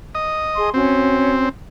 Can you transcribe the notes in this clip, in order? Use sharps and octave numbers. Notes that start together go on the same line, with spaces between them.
D#5
G#4 A5 C6
C4 C#4 F#4